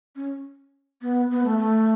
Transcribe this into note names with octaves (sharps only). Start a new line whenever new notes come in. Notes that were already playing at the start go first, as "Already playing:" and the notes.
C#4
B3
B3
A3
A3